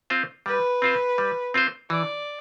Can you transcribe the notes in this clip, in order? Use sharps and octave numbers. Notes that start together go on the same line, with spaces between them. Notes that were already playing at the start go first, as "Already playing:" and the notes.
C4 F4 C5
G3 B4
C4 F4 C5
G3
C4 F4 C5
E3 D5